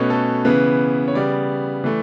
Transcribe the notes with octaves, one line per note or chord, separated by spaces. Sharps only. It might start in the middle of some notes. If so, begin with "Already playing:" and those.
Already playing: B2 A3 C#4 B4
A4
C#3 E3 B3 B4
C#5
C#3 G3 B3 D5
E3 A3